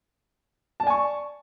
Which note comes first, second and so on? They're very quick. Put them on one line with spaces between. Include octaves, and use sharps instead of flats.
A5 D5 G#5 C#6